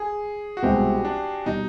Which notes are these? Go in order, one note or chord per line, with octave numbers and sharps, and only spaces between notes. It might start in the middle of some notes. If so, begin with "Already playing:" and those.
Already playing: G#4
F#4
C2 B2 G#3 C4 G4
D4
B2 G3 D#4